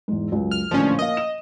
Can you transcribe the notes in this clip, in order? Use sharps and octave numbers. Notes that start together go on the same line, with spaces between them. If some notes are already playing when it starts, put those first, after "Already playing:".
E2 G#2
C#2 F#2
F6
A1 A#2 D3 F3 C#4
A#3 D#5 F5
E7